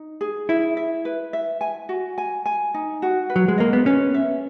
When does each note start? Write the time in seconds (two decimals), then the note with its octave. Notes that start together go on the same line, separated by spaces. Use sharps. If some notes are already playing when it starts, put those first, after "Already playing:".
Already playing: D#4
0.21 G#4
0.49 E4 E5
0.77 E5
1.05 B4
1.33 E5
1.61 G#5
1.89 F#4
2.18 G#5
2.46 G#5
2.74 D#4
3.02 F#4
3.30 B4
3.36 F#3
3.48 G#3
3.58 A#3 D#5
3.73 B3
3.86 C#4 B4
4.14 E5